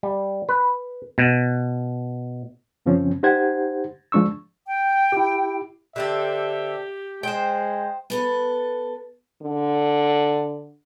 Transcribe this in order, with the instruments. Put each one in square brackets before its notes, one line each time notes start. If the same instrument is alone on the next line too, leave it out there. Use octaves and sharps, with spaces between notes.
[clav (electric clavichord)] G3
B4
B2
[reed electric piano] F#2 C#3 F3 C4 C#4
D#4 G4 C5 F#5 G#6
F3 G#3 D4 C#6 E6
[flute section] G5
[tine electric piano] E4 G4
[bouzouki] D3 C4 A4 [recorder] G4 [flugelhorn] E5
[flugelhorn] G#3 [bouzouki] C5 G5
[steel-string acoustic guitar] B3 A4 B4
[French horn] D3